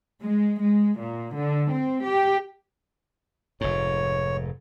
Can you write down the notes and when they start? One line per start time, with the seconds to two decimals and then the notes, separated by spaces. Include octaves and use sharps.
0.22 G#3
0.60 G#3
0.99 A#2
1.36 D3
1.71 C4
2.04 G4
3.61 F1 G#2 C#5